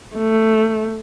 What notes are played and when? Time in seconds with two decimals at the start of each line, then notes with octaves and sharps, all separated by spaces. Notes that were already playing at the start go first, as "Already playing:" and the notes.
0.16 A3